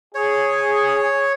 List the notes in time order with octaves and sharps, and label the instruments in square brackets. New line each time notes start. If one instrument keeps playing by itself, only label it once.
[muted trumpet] G#4 [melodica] C#5